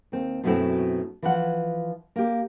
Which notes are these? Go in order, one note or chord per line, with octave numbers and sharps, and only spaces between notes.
D#2 C4
F#2 B2 F#3 A3 C4 E4
E3 F3 F#5
A#3 G4